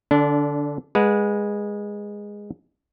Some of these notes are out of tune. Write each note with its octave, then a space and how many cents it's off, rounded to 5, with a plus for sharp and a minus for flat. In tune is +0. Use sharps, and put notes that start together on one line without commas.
D3 +0 D4 -25
G#3 -10 B4 -20 F#5 -35